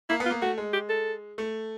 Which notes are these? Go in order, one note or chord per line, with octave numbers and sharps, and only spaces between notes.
A#3 E4
B3
F4
A#3
A3 F#4
G#3
G4
A4
A3